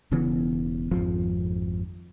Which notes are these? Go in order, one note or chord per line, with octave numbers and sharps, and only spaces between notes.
E1 C#3 E3 B3
G#1 F2 F3